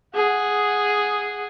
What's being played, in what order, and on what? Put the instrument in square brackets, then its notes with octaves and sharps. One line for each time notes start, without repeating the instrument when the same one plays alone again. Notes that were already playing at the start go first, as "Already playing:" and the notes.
[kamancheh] G#4 F#5